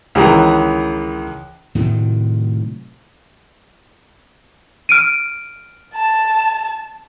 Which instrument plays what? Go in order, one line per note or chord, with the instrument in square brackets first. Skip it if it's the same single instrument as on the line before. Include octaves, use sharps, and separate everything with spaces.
[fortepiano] C#2 D#3 E3 G#4 G5 A#5
[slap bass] A2 C3 D#3 F#3
[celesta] F6 D7 D#7
[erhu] A5